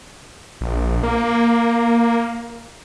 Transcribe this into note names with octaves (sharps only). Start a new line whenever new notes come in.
A#1
A#3